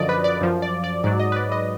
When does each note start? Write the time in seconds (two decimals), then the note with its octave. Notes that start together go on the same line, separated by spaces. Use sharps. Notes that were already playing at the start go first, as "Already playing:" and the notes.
Already playing: F#2 D3 F3 D5 D#5
0.09 B4
0.24 D5
0.41 F#2 F3
0.62 D5
0.84 D5
1.04 G#2 F#3 D5
1.19 D#5
1.32 B4
1.36 D5
1.52 D#5